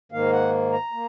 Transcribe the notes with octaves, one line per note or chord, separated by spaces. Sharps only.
G#2 D#3 A#3 F5
F#5
A#5
A#3